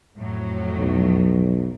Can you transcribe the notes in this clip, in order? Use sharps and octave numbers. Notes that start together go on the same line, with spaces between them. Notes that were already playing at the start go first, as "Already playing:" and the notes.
F2 A2 F#3
B1